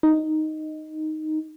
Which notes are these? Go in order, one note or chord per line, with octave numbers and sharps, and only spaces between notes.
D#4